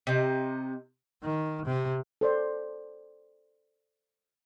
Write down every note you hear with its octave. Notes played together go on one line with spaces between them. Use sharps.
C3 D#4
D#3
C3
A4 C5 D5